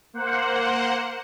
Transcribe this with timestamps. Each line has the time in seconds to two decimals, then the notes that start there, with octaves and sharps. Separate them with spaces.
0.13 A#3 C5 F#5